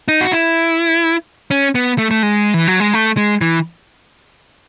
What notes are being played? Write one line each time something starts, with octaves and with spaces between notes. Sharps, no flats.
D#4
F#4
E4
C#4
B3
A3
A3
G#3
E3
F#3
G#3
A3
G#3
E3